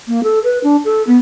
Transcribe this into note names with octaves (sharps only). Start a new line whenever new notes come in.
A#3
A4
B4
D4
A4
B3